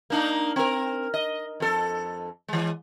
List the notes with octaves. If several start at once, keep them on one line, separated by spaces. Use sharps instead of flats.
A#3 D4 D#4
C4 A#4
D#5
F2 A4
E3 G#3